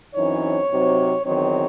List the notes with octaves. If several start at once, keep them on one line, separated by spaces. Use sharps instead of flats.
F#2 E3 C4 D#4 C#5
C3 F#3 C4 D#4
E2 D#3 F#3 C4 D#4 C#5